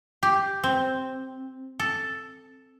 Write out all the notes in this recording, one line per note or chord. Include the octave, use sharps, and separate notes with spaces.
G4
C4
A4